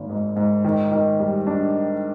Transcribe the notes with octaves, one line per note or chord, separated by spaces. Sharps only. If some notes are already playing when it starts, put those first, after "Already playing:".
Already playing: G#1 A#3
G#2
G#2
D#3
D#3
G3
D4